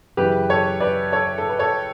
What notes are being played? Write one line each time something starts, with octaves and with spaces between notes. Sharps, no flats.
F#2 C#3 E3 G4 B4
A4 C#5
B4 D5
A4 C#5
A4
B4
A4 C#5